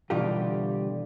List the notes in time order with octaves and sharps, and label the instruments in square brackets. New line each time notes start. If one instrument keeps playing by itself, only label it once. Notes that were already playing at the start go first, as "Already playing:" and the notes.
[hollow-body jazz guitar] B2 D3 E3 G3 F4 G4